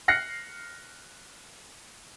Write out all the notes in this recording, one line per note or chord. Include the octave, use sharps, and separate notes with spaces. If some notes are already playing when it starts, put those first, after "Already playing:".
F6 F#6 A#6 C7 C#7